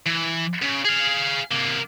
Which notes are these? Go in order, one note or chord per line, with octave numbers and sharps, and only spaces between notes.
E3
C#3
G#4 F5
C3 A#3